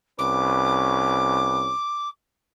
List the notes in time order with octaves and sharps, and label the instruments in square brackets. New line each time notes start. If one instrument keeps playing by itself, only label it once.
[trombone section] C2 C#4 B4 [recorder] D6